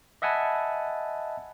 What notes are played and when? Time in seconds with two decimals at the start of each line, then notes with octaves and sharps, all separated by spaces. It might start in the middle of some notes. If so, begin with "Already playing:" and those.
0.22 D#5 E5 F#5 G#5 A5 B5